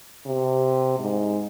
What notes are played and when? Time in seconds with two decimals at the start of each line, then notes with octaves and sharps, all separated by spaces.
0.26 C3
0.99 G#2